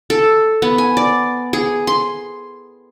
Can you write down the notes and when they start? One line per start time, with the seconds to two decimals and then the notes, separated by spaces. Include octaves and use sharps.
0.10 A4
0.62 B3
0.78 G#5
0.97 D5
1.53 G#4
1.87 C6